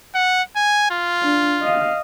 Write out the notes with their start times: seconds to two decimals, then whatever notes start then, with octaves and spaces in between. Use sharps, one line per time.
0.15 F#5
0.56 G#5
0.91 F4
1.21 D4
1.62 D#5 F5